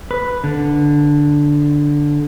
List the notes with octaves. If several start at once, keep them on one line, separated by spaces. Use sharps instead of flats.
B4
D3